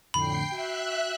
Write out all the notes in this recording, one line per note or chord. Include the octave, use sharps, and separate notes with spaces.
F2 A2 D3 G5 B5 C7
F#4 E5 F#6